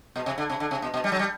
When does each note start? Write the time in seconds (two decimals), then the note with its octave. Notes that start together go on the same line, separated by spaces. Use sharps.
0.16 B2
0.26 C3
0.38 D3
0.49 C3
0.60 D3
0.71 C3
0.82 B2
0.94 B2
1.04 G3
1.12 F#3
1.19 G3